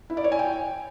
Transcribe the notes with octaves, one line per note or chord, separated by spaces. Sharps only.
E4
D5
C#5
G#5
G5